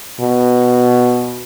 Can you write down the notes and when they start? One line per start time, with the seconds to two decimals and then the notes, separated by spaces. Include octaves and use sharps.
0.20 B2